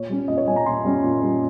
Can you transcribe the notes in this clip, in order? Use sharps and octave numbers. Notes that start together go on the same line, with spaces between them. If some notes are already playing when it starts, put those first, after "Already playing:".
Already playing: A#2 C#5
G3 C#4
A#2 D#5
C#5
G3 C#4 G#5
A#5
A#2 C6
G3 C#4
A#2
G3 C#4